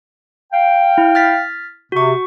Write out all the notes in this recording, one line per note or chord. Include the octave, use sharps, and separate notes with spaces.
F5 G5
E4
F6 A6 B6
C3 F#4 C#6